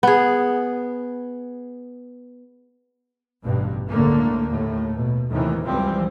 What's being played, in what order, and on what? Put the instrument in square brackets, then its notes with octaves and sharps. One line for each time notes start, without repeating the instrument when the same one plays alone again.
[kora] B3 G#4
[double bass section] A1 G2 B2
C#2 A2 D3 A3 A#3
D#2 A2 A3
B2
D#2 A2 C3 D#3 E3
C#2 F#2 E3 F3 G3 C4